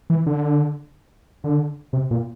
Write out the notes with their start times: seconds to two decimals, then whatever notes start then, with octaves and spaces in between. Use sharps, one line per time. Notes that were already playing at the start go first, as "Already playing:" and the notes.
0.10 E3
0.27 D3
1.44 D3
1.93 C3
2.11 A#2